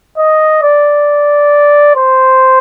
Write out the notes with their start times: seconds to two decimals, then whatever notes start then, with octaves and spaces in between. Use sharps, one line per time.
0.18 D#5
0.63 D5
1.96 C5